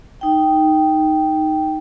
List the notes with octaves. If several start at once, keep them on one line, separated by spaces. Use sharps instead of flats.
D#4 G5